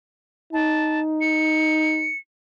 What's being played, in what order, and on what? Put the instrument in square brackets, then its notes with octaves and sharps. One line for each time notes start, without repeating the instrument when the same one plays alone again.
[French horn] D#4 [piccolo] A5
[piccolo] C#7